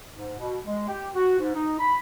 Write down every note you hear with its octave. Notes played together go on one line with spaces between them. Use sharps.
G#2
B2
G#3
G4
F#4
G#2
D#4
B5